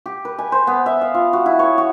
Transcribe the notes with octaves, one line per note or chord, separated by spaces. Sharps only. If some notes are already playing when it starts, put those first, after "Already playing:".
G4
B4
G#5
C5
B3
E5
F5
F4
F#4
E4
C#5
F#4